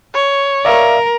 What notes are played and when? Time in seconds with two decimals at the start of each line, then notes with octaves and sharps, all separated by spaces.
0.14 C#5
0.65 A#4 D5 E5 F5